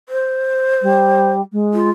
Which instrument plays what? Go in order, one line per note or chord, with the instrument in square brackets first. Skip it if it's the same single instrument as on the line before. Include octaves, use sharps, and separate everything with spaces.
[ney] C5
[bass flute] G3
G#3
[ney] F4